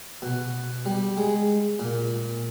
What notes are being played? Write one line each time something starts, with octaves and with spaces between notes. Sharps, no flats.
B2
G3
G#3
A#2